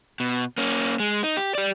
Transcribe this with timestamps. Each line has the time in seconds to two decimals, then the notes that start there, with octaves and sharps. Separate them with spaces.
0.20 B2
0.58 A#3 C#4
1.00 G#3
1.24 D#4
1.37 G4
1.55 G4 D5